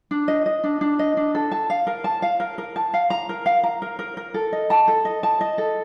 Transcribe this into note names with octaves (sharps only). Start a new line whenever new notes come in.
D4
D#5
D#5
D4
D4
D#5
D4
A4
A5
F5
A#4
A5
F5
A#4
A#4
A5
F5
A#5
A#4
F5
A#5
A#4
A#4
A#4
A4
D#5
A5
A4
D#5
A5
D#5
A4